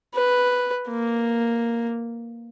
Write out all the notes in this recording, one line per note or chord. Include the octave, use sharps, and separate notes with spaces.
B4
A#3